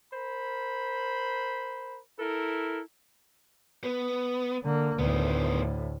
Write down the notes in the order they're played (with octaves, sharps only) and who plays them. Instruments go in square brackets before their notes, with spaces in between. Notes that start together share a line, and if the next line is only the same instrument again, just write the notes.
[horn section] A#4 C5 B5
E4 A4 A#4
[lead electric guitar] B3
[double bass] D3 A#3
[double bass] D2 A2 [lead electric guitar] D#3 B3